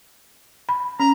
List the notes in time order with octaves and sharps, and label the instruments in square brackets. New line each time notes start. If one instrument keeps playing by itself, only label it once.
[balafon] B5
[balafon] C#4 [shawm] A#5